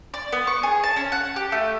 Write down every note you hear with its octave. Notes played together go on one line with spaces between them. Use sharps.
D5
B3
C#6
G#4
A5
C#4
F#5
G4
A3